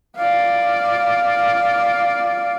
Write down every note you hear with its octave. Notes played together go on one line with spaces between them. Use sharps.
D5 F5